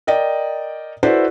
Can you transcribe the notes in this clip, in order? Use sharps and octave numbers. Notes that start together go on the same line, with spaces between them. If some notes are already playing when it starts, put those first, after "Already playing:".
A#4 D5 D#5 G5
E4 F#4 A4 B4 C5 D5